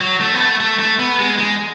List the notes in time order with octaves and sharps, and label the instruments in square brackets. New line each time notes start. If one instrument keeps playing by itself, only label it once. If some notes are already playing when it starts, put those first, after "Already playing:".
[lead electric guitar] F#3
A3
B3
A3
A3
A3
B3
G#3
G#3